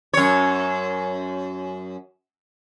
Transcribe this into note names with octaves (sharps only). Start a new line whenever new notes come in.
F#2 C#5